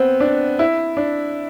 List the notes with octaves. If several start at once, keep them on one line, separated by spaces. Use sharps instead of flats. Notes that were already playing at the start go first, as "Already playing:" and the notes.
Already playing: B3 C4
D4
E4
D4